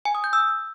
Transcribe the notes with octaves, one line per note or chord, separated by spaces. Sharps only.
G#5
D#6
G6
E6